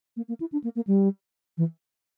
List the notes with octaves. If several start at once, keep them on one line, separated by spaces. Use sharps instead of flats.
A#3
A#3
E4
D4
A#3
A#3
G3
E3